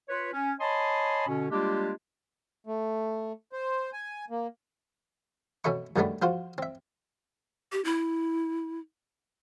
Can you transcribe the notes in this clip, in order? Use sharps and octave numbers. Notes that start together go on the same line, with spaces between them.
F4 B4 C#5
C#4
C#5 D#5 G#5 A5 B5 C6
B2 D3 C#4
G3 G#3 A#3 D4 F4 G4
A3
C5
G#5
A#3
B2 C#4 A4 E5 C#6
F#2 D#3 G3 A3 B3 D4
F3 F4 F#4 C5
C4 E5
G4
E4